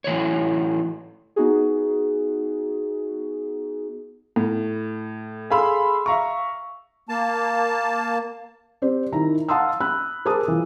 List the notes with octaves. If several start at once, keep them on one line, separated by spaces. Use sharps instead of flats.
A2 E3 F#3 C#5
B3 D#4 F#4 G#4
A2
G#4 A4 F5 B5 C6 E6
E5 F5 A#5 C#6
A#3 A5
C4 G4 C5 D5
D#3 E4 A#5
F5 F#5 A5 C6 D#6 E6
B5 E6 F#6
G#4 A#4 C5 A5 D6 D#6
E3 F3